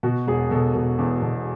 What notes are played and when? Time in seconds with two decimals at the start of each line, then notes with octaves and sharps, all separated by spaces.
0.03 B2 F#4
0.27 E1 G#4
0.51 B2 A4
0.75 B2
0.99 E2
1.22 B2